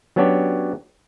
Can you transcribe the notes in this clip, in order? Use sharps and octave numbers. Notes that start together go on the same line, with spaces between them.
F#3 B3 C#4 D4 F#4 G4